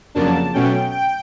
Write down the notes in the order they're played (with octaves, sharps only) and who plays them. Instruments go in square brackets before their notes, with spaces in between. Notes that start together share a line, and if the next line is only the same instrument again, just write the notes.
[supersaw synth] F2 C#3 F#3 A#3 D4 A5
B2 F#3 A3 C#4 G5
G5